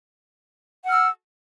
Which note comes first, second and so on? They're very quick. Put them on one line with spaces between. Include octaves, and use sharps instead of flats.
F#5 F6 E6